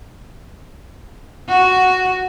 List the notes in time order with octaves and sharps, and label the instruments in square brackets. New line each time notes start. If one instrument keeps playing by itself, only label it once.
[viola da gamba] F#4